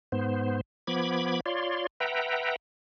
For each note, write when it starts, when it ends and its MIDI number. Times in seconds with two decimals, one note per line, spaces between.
0.12 0.61 44
0.12 0.61 59
0.12 0.61 72
0.87 1.40 53
0.87 1.40 59
0.87 1.40 83
0.87 1.40 86
0.87 1.40 92
1.46 1.87 65
1.46 1.87 73
1.46 1.87 74
1.46 1.87 84
2.00 2.56 71
2.00 2.56 76
2.00 2.56 78
2.00 2.56 79
2.00 2.56 82